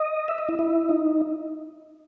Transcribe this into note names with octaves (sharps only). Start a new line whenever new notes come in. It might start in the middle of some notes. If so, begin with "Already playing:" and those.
Already playing: D#5
E5
D#5
E4
E4
D#4